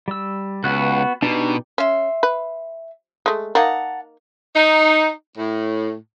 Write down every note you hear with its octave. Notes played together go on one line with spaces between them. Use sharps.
G3 E6
C#2 B3 F#4 F#6
B2 D4 D#4 G4
C#4 E5 C6
B4
G#3 A3
A#3 D#4 F#5 A5 A#5
D#4
A2